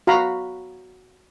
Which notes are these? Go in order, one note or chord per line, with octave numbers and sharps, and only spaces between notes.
F#4 F5 A#5 B5